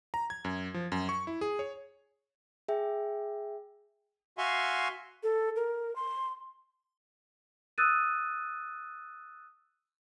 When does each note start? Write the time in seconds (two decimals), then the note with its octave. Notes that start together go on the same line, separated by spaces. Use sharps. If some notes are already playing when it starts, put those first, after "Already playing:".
0.14 A#5
0.30 G#6
0.45 F#2
0.74 F3
0.92 F#2
1.09 C#6
1.27 E4
1.41 G#4
1.59 C#5
2.68 G#4 E5 G5
4.38 F#4 E5 F5 G#5 C6 C#6
5.23 A4
5.56 A#4
5.96 C6
7.78 D#6 E6 F#6 A6 D#7